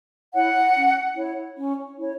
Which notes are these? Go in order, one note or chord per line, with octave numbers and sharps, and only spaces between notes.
E4 C#5 F#5
C#4
E4 C#5
C#4
E4 C#5